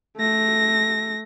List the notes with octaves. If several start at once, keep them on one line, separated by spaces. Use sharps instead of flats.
A3 A#6